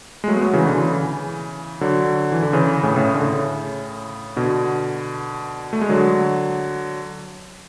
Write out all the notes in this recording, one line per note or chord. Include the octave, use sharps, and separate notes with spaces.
G#3
F#3 A3
B3
F#3 A3
C#3 E3
B2 D3
C#3 E3
D3 F#3
E3
D3
C#3 E3
A2 C#3
A2 C#3
D3
A2 C#3
B2 D3
A3
G#3
D3 F#3